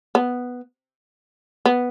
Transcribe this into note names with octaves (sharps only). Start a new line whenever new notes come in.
B3
B3